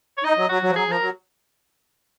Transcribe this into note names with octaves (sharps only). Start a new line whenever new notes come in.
C#5
D#4 D#5
F#3
F#3 F#4
F#3
F3
F#3 G#4
F3 A#4
F#3